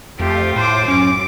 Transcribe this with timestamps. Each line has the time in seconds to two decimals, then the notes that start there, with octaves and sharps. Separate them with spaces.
0.20 F2 A3 F4 G4
0.56 A2 C5 D6
0.88 F#2 C#4 D6